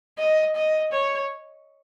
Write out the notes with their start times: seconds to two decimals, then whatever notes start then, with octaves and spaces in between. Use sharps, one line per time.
0.18 D#5
0.56 D#5
0.92 C#5